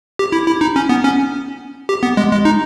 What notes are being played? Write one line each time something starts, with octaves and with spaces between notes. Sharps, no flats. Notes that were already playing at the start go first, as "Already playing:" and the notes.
G4
E4
E4
D#4
C#4
B3
C#4
G4
B3
G#3
G#3
D#4